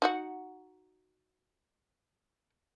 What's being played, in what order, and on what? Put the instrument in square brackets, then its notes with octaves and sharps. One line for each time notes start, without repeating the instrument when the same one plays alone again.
[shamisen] D#4 F#4 F#5